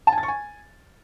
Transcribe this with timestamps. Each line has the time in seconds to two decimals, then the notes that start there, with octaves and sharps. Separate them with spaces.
0.07 A5
0.12 G#5
0.18 A6
0.23 C#6
0.28 G#5